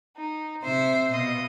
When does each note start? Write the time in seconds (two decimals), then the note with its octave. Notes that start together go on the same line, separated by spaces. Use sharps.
0.17 D#4
0.64 C3 C5 E5
1.13 B2 D#5 F5